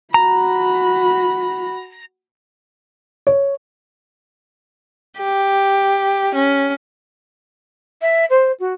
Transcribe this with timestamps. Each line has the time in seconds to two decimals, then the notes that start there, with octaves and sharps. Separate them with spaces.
0.14 F#4 A#5 B5
3.27 C#5
5.18 G4
6.35 C#4
8.02 E5
8.30 C5
8.60 F#4